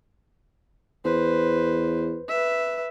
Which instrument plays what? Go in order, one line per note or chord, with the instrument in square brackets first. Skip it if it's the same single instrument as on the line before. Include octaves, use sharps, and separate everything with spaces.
[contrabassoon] E2 [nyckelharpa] B4 C5
[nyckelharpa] B4 E5